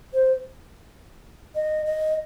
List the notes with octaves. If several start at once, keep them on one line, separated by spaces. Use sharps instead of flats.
C5
D#5
D#5